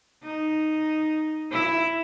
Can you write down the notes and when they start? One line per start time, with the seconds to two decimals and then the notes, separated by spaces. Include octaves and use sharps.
0.23 D#4
1.51 E4